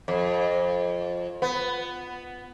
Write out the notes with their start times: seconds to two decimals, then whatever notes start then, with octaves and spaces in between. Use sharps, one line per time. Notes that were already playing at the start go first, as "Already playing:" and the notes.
0.08 F2
1.42 B3